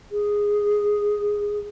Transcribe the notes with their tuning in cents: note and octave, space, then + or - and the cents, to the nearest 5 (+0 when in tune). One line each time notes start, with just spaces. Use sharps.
G#4 -5